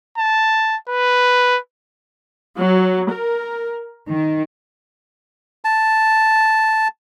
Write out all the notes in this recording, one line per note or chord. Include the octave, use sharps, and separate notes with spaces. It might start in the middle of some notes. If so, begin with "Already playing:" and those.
A5
B4
F#3
A#4
D#3
A5